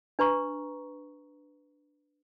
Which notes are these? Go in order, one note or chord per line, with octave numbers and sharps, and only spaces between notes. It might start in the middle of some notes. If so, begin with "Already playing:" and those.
D4 B4 A#5 C#6